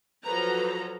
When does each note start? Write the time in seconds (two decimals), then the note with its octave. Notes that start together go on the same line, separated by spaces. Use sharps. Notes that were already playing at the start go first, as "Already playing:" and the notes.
0.24 F3 F#3 A4 B4 A#5